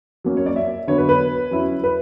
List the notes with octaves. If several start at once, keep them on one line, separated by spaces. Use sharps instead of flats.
F#3 A#3 C#4
C#5
D5
E5
D3 F#3 B3 C#5
B4
B4
F#3 C#4 E4
B4